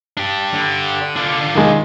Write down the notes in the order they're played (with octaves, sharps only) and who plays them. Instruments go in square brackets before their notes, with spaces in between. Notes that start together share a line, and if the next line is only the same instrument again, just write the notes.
[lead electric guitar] D4 G4
[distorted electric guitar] D3
[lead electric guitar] D4 F4
[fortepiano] D#3 G#3